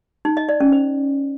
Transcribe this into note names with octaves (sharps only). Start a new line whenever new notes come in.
D#4
D#5
D5
C#4
C5